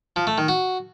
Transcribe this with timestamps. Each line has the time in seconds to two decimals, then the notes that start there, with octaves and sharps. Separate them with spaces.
0.16 F3
0.27 A3
0.38 D#3
0.48 F#4